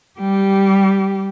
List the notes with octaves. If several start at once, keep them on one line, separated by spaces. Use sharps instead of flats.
G3 G4